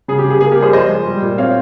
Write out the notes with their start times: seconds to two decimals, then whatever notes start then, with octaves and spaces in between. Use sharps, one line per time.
0.08 C#3 G#4
0.19 G4
0.24 C#3
0.30 G#4
0.41 A#3 G#4
0.51 G4 A#4
0.57 G3
0.62 G#4 C5
0.73 F3 C5 D#5
0.90 G#3
1.06 G3
1.22 A#2
1.38 C4 C#5 F5